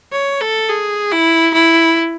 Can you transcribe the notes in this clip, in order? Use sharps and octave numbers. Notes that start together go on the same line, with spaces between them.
C#5
A4
G#4
E4
E4